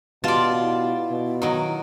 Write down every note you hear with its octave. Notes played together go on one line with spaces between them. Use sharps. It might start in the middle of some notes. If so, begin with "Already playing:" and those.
B2 F4 G4 D5 A5
E4
B2
D#3 F#3